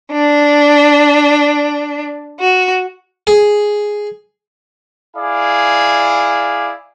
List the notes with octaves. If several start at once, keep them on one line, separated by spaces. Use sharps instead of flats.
D4
F#4
G#4
E4 G#4 D5 F5